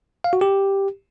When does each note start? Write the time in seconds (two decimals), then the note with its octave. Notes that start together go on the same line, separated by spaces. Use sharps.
0.24 F5
0.33 F#4
0.41 G4